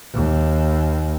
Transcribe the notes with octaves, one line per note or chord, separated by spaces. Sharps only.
D#2